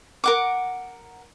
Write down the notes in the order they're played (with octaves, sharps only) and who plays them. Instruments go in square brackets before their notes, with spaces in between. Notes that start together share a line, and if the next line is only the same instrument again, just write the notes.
[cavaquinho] A#4 F#5 D6